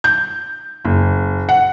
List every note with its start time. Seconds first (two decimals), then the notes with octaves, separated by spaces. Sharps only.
0.04 G6
0.85 F#1
1.49 F#5